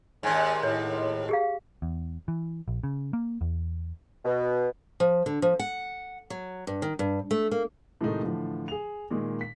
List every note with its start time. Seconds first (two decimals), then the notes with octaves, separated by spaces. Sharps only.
0.23 D#2 G#2 C#4 D5 G#5
0.63 A2 C#5
1.29 G4 G#4 F5
1.82 E2
2.28 E3
2.68 A#1
2.84 C#3
3.13 A#3
3.41 E2
4.25 B2
5.00 F3
5.26 D3
5.42 F3
5.59 F#5
6.30 F#3
6.67 G2
6.82 D#3
6.99 G2
7.31 A3
7.51 A#3
8.01 A2 C3 D#3 G#3 A3 D#4
8.23 A2 D3 E3 F3
8.68 G#4 F7
9.10 A#2 D#3 G#3
9.41 B6